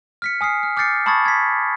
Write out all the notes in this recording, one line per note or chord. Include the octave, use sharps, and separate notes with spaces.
F6 B6 C#7
G#5 D#6 F6 C7
F6
D6 F6 G6 A6 C7 C#7
A5 B5 C#6 D#6 G#6 A6
G#6 B6